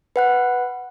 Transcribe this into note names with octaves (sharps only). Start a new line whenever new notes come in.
B4 F#5 F#6